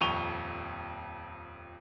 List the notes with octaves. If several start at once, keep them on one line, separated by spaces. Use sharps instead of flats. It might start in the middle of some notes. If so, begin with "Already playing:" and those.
D#1 F2 C#6 D#7 F7 G7